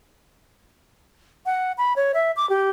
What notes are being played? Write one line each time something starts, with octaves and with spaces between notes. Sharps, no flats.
F#5
B5
C#5
E5
D6
G4